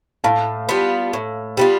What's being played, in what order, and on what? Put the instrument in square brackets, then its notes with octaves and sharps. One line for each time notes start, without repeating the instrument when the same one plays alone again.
[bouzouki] A2 [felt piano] F5 A5
[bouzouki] G3 B3 F4
A2
G3 B3 F4